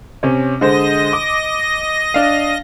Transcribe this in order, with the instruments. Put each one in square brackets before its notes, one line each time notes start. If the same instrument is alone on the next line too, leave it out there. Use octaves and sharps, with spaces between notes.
[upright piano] C3 C#4 C#5
[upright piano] D3 G#3 C5 [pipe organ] D#5 A#6
[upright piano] D6
D4 F5